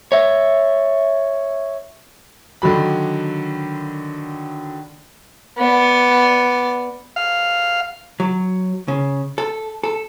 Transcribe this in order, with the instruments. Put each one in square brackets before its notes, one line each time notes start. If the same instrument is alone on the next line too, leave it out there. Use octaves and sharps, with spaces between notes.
[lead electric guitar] C#5 E5
[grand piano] D3 D#3 F#3 B5
[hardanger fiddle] B3 D5
[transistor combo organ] F5
[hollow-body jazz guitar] F#3
C#3
A4
A4